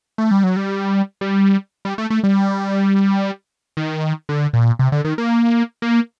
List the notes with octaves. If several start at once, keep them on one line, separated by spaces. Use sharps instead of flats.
A3
G3
F#3
G3
G3
G3
A3
A3
G3
D#3
D3
A#2
C3
D3
D#3
A#3
A#3